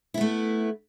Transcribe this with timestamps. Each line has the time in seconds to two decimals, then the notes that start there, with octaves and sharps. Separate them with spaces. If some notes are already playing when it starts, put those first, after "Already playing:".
0.14 E4
0.18 B3
0.21 A3